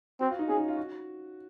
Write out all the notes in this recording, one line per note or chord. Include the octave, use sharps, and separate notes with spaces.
C4 F#4
F4
D#4
C#4 G#4
D#4
F4
F#4